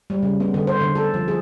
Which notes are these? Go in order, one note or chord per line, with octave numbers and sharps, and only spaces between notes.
G3
C#3
B3
D3
C5
D3
A4
F3
G#4